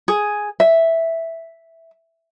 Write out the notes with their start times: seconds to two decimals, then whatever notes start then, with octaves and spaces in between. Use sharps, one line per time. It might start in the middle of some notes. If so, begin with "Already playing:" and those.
0.08 G#4
0.60 E5